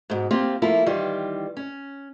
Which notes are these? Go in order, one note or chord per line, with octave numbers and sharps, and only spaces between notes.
G#2 B2
A#3 C4 F4 G4
F3 A3 A#3 E4 F4
D#3 E3 G3 F4
C#4